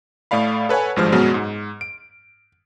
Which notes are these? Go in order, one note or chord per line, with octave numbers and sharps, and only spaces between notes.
A2 A3 D5 F5 B5
A4 B4 C#5 F#5 G#5
G#1 G2 F3 G#3 C5 F6
F#2 B2 F#3 G#3 B3
G#2
D7